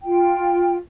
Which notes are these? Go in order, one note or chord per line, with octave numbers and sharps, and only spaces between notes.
F4 G5